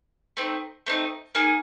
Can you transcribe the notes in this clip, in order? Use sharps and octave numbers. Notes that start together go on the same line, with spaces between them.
A3 C4 D#4
A3 C4 D#4
A#3 D#4 G#4